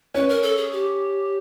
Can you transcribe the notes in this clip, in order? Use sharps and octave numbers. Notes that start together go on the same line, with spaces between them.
C#4 B4
A#4
A4
G#4
G4